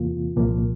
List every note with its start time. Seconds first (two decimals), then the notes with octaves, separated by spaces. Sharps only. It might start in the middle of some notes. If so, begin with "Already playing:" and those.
Already playing: E2 C3 E3 A#3 F4
0.36 C2 A#2 F3 A#3